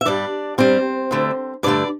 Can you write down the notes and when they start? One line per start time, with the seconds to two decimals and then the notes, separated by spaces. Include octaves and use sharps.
0.01 E5
0.05 G2 G3 D4 D5
0.58 G2 G3 C4 C5
1.11 D2 D3 A3
1.63 G2 D3 A3 D4 D5